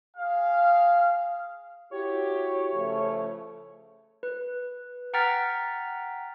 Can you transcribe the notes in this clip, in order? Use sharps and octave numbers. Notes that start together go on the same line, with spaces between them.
G#4 F5
E4 F#4 G4 C#5
C#3 F3 A3
B4
F#5 G5 A#5 F6 A6 B6